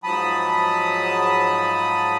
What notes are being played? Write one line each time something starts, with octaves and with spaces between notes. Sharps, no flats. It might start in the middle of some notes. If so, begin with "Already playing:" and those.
G#2 F3 F#3 A5 B5 D#6